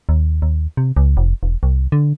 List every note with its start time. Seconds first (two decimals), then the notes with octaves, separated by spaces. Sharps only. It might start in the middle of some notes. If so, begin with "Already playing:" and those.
0.09 D#2
0.42 D#2
0.77 C3
0.97 C#2
1.17 F1
1.43 E1
1.63 C2
1.92 D3